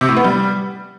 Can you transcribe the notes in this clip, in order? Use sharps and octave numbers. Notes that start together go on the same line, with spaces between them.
C3
A2
B3
G3